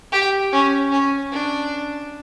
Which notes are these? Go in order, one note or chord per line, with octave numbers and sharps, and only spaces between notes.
G4
C#4
C#4
D4